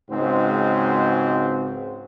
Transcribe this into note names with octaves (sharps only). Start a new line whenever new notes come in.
C#2 G#2 G#3 C4 F#4 C5